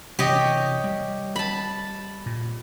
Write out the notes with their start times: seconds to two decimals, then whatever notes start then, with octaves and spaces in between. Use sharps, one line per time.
0.19 C3 E3 G4 C#5 D#5
0.84 G3
1.36 A5 B5
2.26 A#2